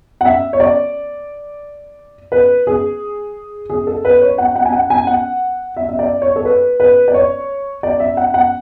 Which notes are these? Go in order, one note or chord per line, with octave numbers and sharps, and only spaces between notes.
F#5
E5
C#5
D5
B4
G#4
G#4
A4
B4
C#5
F#5
F#5
G#5
F#5
G#5
F#5
E5
E5
D5
C#5
A4
B4
B4
D5
C#5
D5
E5
F#5
F#5